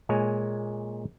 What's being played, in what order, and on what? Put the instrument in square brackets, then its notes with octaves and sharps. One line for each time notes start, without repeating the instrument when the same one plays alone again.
[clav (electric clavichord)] A#2 G#3 C#5 G#5